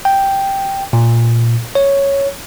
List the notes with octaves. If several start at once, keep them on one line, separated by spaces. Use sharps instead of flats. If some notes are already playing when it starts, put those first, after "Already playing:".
G5
A#2
C#5